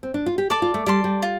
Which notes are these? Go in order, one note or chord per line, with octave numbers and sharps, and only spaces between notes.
C4
D4
F4
G4
A4 D5 A5 D6
F4
A3
G3 D5 A5 C6
G3
F4